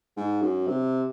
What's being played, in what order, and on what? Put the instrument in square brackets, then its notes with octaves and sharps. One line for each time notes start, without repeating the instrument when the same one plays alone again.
[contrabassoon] G#2
F#2
C3